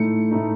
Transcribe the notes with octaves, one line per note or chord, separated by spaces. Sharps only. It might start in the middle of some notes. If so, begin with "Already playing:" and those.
Already playing: A2 A3 D#4 C#7
A2 A3 D#4